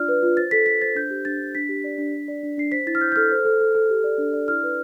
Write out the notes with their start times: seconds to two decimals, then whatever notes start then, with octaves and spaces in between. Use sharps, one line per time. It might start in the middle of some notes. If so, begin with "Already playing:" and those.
Already playing: D4 F4 D5 F6
0.08 B4
0.23 F4
0.37 C5 A6
0.51 A4 B6
0.66 A4 B6
0.82 C5 A6
0.95 D4 G6
1.10 G4
1.25 D4 A6
1.39 D4
1.55 D4 B6
1.69 G4
1.84 D5
1.98 D4
2.13 D4
2.28 D5
2.43 D4
2.57 D4 C7
2.72 C5 B6
2.87 E4 A6
2.95 F6
3.01 C5 G6
3.12 G6
3.16 A4 F6
3.31 C5
3.45 A4
3.60 A4
3.75 A4
3.90 G4
4.04 D5
4.18 D4
4.33 D5
4.48 E4 F6
4.63 B4